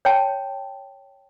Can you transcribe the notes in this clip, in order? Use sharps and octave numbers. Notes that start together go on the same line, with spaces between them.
C#5 G5 A5